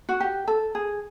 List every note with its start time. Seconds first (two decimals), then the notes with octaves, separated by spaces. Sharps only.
0.09 F#4
0.20 G4
0.47 A4
0.75 G#4